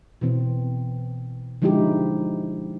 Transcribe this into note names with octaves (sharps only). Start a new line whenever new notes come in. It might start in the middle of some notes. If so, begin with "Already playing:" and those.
B2 E3 C4
D3 F3 G#3 D#4 E4 G4